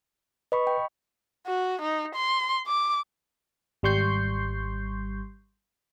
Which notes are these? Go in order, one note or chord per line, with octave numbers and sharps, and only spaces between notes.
B4 D#5 B5 C#6
G5
F#4
D#4
C6
D6
G#1 G3 C6 C#6 G6 C7